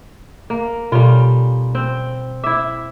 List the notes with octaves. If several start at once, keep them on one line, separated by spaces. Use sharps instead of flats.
A#3
B2 G3 C#4 F4
C4
E4 E5 D6